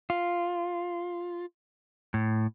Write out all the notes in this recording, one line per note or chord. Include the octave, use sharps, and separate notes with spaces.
F4
A2